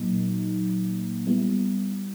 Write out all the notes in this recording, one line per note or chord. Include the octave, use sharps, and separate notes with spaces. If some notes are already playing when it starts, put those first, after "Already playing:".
Already playing: A#2 F#3 A#3 D#4
G3 B3 E4